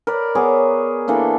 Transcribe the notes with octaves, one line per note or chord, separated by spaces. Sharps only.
A#4 B4 D5
B3 G#4 C#5 D6
E3 A#3 D4 A4